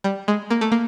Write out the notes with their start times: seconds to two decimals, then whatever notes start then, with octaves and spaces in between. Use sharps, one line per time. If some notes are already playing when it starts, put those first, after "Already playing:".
0.04 G3
0.28 G#3
0.50 A#3
0.61 A3
0.72 A#3